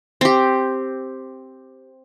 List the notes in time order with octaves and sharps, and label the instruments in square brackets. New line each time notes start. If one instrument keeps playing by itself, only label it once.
[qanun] C4 G4